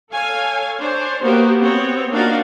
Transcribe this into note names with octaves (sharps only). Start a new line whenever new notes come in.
A4 C#5 F5 G#5
D4 C5 C#5
A#3 B3 F#4 G4 C5
B3 C4 C#5
A#3 D4 D#4 F4 F#4 F5